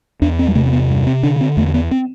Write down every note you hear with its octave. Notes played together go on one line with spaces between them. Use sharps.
E2 D4
C4
G3
C3 A3
C4
B3
G2
C4
D3 D4
C4
E2 A3
B3
C4